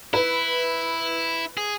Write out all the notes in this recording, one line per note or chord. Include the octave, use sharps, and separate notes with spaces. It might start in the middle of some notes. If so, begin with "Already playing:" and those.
E4 B4
G#4